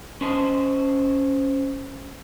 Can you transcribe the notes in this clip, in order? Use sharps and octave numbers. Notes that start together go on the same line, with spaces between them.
C#4 C5 D#5 A5